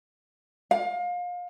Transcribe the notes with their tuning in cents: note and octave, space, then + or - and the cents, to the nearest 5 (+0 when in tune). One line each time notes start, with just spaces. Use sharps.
F5 +30